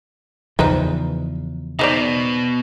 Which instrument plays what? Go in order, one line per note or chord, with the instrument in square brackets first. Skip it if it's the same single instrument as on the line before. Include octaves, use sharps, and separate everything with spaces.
[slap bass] E2 C#3 F3 [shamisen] D#4 B4 C5
[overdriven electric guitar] B2 [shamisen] D#4 C5 D5